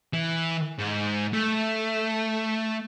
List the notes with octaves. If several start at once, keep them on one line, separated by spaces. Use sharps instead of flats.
E3
G#2
A3